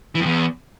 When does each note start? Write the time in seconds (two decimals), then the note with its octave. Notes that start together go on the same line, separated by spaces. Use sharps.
0.15 E3
0.20 F2
0.26 E2